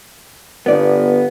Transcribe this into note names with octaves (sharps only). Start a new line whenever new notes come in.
G1 B3 D5